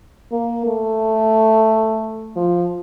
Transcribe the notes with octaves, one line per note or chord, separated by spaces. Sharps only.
A#3
A3
F3